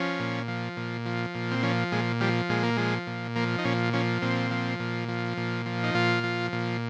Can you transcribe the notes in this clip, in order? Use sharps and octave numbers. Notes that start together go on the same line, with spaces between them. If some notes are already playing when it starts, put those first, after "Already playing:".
Already playing: F3 C#4
A#2
F3
A#2
F3
A#2
C4
F3 C#4
A#2 G#3
F3 G3
A#2 G#3
A#3
F3 G#3
A#2
F3 A#3
D#4
A#2 C#4
F3 C#4
A#2 C4
F3
A#2
F3
A#2
F3
D#4
A#2 F4
F3
A#2